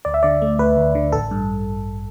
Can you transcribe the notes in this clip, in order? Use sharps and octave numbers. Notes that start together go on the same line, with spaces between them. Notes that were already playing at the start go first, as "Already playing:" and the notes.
D2 D5
E5
D3 D5
A3
D2 B4
D2
D3
A1 A4
G2